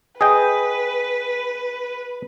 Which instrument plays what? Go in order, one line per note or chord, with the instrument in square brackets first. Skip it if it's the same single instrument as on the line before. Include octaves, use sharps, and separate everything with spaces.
[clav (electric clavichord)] G#4 D#5 G5 [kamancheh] B4